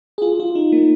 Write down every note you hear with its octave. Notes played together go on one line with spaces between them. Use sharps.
G#4
F4
F4
D#4
A#3